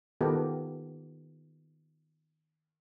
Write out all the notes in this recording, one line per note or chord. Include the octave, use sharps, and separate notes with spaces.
D#3 B3 F4 G4 A4 A#4